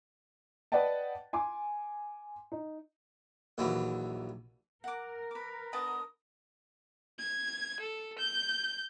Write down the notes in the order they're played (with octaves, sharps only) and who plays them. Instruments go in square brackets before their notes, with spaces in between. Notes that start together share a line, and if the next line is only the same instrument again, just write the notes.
[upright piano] B4 D5 D#5 F#5 G5 A5
G#5 C6 D6
D#4
[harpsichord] A#1 D#2 E3 F#3
[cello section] A#4 [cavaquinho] F#5 D6
[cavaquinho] B4 D6
[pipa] D3 B3 A5 [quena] D#6
[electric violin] G#6
A4
G6